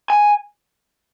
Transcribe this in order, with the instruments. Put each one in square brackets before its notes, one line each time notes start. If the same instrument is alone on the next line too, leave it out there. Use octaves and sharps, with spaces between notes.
[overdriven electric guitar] G#5